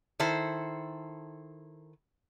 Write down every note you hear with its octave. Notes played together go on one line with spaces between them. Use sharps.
D#3 E4 A4 C5